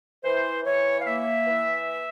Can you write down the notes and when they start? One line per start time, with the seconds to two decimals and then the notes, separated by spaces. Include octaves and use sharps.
0.23 E3 C5
0.65 E3 C#5
1.00 F5
1.06 A#3 E5
1.47 E3